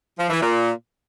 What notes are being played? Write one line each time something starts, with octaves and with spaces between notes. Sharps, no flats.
F3
E3
A#2